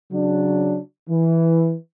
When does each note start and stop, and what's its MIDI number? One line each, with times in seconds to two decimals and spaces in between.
0.12 0.79 49
0.12 0.79 54
0.12 0.79 62
1.10 1.73 52